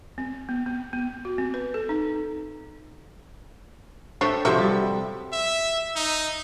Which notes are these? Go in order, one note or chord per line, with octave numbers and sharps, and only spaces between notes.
C4
B3
B3
B3
F#4
C4
B4
A4
D#4
D4 A4 C5 C#5 E5 G5
C3 F3 F#4 A4 E5
G3
E5
D#4